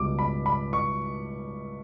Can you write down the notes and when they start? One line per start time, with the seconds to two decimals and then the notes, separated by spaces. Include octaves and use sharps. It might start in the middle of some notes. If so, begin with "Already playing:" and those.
Already playing: C#2 B2 G3 D6
0.19 B5
0.46 B5
0.73 C#6